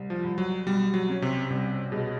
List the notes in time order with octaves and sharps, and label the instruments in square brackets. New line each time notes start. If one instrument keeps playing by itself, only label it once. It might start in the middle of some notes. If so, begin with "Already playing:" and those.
Already playing: [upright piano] C2
[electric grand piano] F3
[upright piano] C2
[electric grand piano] F#3
[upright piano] B2 [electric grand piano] G3
[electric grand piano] F#3
[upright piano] C#4
[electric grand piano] C3
[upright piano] C2 [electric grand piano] C3
[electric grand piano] B2 [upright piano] G#3